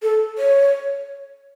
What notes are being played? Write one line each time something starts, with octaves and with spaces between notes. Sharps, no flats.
A4
C#5